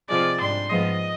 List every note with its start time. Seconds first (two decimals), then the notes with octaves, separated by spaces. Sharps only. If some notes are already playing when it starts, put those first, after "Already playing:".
0.09 C3 F3 G#3 D5
0.40 G#2 G3 D4 C6
0.70 G#2 F3 G#3 B3 F4 D#5